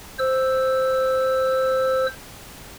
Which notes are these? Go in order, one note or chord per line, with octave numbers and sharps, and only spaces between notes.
C5 E6